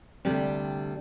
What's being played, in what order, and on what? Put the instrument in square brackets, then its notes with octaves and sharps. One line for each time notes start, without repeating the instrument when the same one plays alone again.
[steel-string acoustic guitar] D2 C3 G3 D4